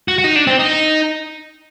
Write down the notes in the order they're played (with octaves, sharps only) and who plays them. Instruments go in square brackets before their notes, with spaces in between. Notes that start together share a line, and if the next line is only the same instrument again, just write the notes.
[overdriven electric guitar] F#4
F#4
D#4
D4
C4
D#4